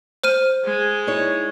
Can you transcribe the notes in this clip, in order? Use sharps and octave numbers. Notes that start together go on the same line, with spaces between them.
C5 F6 D#7
G#3
D#4 E4 C#5